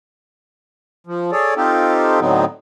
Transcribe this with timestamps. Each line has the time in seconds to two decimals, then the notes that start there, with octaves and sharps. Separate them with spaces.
1.07 F3
1.32 G#4 A4 C#5 D5
1.57 C4 D#4 F4 G4 A4
2.20 A2 D3 F#3 B3 C4 D#4